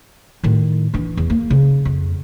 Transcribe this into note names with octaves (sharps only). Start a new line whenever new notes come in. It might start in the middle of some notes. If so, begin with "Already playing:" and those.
A2 D#3
E3 D4
E2
A#3
C#3
F2